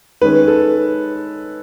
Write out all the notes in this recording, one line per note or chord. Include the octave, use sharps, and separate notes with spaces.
D#3 G#3 C#4 B4
A4